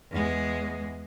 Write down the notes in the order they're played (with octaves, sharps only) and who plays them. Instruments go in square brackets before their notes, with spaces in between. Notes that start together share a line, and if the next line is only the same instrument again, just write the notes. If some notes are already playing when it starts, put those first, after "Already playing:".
[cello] E2 G#3